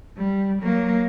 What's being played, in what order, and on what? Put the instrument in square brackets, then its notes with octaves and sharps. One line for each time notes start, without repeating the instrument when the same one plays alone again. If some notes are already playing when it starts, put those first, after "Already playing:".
[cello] G3
F#3 A#3